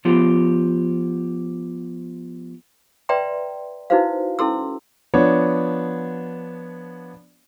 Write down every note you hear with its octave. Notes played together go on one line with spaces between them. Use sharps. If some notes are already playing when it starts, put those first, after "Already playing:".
F3 B3 F4 G4
B4 D5 E5 G5 A#5 C6
D#4 E4 F#4 B4 C5 F5
C#4 E4 A4 C6 E6
F3 B3 D4 C#5